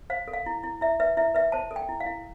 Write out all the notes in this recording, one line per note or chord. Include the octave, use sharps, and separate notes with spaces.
C5 F5
A4
F5
E4
E4
E4 E5
B4 E5
E4 E5
B4 E5
C5 A5
A4
G5
E4
F5
E4